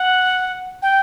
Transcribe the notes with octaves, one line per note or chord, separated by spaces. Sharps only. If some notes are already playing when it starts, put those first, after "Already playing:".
Already playing: F#5
G5